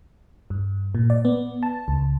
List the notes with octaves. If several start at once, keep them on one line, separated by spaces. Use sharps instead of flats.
G2
A#2
D5
B3
A5
C#2